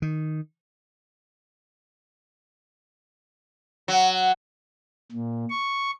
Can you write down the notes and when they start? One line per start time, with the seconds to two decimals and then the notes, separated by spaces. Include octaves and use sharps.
0.02 D#3
3.88 F#3
5.12 A#2
5.49 C#6